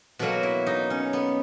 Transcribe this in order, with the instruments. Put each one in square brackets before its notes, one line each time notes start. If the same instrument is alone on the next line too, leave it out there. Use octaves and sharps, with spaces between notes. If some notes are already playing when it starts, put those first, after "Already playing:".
[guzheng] B2 F#3 A#3 F#4
E4
D#4
C#4
B3